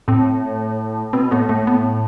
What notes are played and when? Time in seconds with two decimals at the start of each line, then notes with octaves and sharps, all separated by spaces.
0.08 A2 C4
1.13 B2 C4
1.31 A2 B3
1.49 A2 A3
1.67 B3